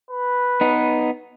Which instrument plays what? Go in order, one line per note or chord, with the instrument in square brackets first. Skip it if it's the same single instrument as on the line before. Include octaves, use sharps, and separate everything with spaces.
[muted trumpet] B4
[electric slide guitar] B3 D#4